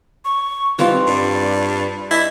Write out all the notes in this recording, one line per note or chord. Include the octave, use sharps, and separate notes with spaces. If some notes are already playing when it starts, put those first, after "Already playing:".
C#6
E3 G3 C4 D#4 F4
G2 D5
E4 D#5